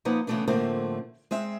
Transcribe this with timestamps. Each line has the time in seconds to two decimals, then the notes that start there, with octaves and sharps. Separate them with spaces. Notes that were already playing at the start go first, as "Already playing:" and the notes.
0.05 F3 A#3 D#4 B4 F#5
0.27 C#3 E3 F#3 A3 B3 D4
0.48 A2 D3 F3 A3 A#3 C4
1.31 G#3 C4 E5